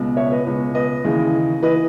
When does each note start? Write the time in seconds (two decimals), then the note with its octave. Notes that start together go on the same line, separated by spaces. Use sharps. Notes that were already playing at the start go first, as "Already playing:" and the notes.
Already playing: C#2 B2
0.16 C#5 E5
0.32 B4 D#5
0.46 C#2 B2
0.75 B4 D#5
1.04 D#2 C#3 E3
1.63 E3 B4 D#5